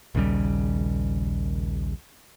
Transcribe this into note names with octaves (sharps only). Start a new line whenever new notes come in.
A#1 D#2 C#3 G3